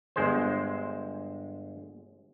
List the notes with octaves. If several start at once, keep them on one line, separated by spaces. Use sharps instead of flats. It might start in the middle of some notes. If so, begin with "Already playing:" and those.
G1 G#3 C5